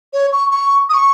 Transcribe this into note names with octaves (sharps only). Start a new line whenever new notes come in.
C#5
C#6
C#6
D#6
C#6